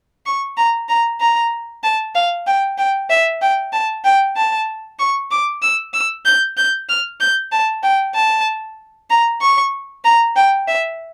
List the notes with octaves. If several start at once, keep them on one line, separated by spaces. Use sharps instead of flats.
C#6
A#5
A#5
A#5
A5
F5
G5
G5
E5
G5
A5
G5
A5
C#6
D6
E6
E6
G6
G6
F6
G6
A5
G5
A5
A#5
C#6
A#5
G5
E5